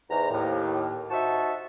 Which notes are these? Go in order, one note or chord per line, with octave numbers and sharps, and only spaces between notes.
E2 G#2 A#5
D#2 A2
D#4 F#4 C5 E5 A5